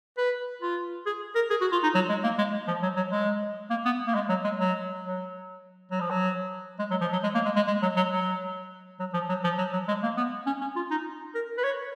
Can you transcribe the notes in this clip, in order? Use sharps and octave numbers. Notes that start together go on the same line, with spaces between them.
B4
F4
G#4
A#4
G#4
F#4
F4
D#4
F#3
G#3
A#3
G#3
F3
F#3
F#3
G#3
A#3
B3
A#3
G#3
F#3
G#3
F#3
F#3
F#3
F3
F#3
G#3
F#3
F3
F#3
G#3
A#3
G#3
G#3
G#3
F#3
F#3
F#3
F#3
F3
F#3
F3
F#3
F#3
G#3
A#3
B3
C#4
C#4
F4
D#4
A#4
B4
C#5